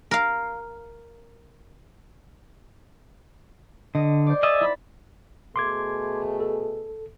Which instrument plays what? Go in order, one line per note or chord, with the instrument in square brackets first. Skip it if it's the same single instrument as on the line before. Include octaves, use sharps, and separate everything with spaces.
[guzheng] A#4 F5
[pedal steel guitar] D3 [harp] D#5
[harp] C5 D5
[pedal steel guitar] G#4 D#5 E5 [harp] D6 A6
[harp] E4 B5
[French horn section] B2 A3 G#4 [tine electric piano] C6 D6 G#6
[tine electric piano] A4